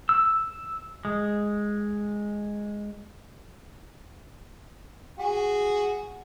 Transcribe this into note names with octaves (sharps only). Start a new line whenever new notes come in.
E6
G#3
F#4 G#4